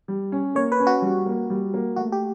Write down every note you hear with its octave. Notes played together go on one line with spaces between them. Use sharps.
G3
C#4
A#3 C#5
B4
C#4
F#4
G3
A#3
G3
A#3
A3 F#4
G4